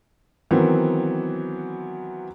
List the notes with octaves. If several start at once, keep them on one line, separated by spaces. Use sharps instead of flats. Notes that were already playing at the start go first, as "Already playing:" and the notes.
D#3 E3 F#3 B3 C4